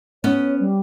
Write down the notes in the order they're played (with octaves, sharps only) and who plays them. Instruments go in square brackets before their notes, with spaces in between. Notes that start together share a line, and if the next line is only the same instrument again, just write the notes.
[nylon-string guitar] B3 C#4 [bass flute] C#5
[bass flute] G3